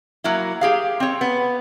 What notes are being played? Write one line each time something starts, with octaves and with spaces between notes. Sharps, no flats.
F#3 A#3 E4
G4 G#4 F5
C4 C#5
B3